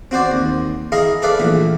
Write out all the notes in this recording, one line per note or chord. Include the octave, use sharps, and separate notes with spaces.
C4 F#4 C5 D5
D#2
E4 G#4 A#4 D#5 F5
G#4 A4 B4 D5 E5 F5
A#1 E3 A3